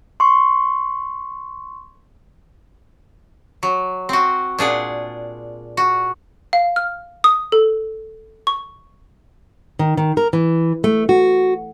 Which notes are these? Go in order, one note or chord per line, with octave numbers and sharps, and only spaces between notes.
C6 C#6
F#3
C4 F#4
A#2 D4 G#4 F#5
F#4
F5
F6
D#6
A4
C#6
D#3
D#3
A#4
E3
A3
F#4